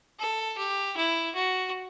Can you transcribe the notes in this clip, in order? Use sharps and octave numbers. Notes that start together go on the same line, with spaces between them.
A4
G4
E4
F#4